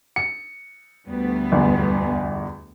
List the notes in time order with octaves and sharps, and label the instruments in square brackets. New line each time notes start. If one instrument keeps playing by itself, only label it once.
[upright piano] C#7
[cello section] D2 G3 B3
[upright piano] G1 E2